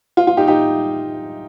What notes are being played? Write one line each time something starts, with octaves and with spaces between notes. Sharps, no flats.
F4
F4
D#4 G4
D#4 G4